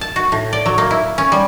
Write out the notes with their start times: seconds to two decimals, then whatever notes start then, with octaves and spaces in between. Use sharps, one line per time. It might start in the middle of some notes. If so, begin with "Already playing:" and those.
0.01 A5
0.16 F#4
0.32 A2
0.53 D5
0.66 F#3
0.78 A#3
0.91 E4
1.18 C#4
1.32 G3